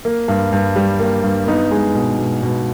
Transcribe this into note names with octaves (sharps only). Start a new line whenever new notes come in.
A#3
G2
G2
G3
A#3
G2
B3 D#4
G#3
B2
B2
B2